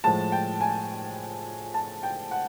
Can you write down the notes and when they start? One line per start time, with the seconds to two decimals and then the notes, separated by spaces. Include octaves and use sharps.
0.04 A2 F3 G#3 A5
0.32 G5
0.61 G#5
1.74 A5
2.03 G5
2.31 F#5